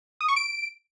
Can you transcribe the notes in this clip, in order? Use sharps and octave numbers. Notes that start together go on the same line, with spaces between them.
D#6
C#6
D7